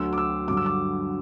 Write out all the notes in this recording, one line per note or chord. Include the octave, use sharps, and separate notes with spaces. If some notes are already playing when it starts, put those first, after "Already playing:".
Already playing: D2 D3 F#3 E6
D6
E6
G2 D3 F#3 D6
E6
D6